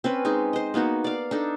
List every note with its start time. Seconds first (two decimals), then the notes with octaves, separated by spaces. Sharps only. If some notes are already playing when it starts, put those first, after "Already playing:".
0.04 C4 C#4 B4
0.25 G#3 D#4 G#4
0.53 C5 D#5
0.74 A#3 B3 D#4 F#4
1.04 D5 F5
1.31 D4 D#4 A4